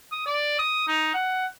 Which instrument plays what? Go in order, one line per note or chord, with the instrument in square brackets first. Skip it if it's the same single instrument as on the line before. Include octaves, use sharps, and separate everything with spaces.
[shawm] D#6
D5
D#6
D#4
F#5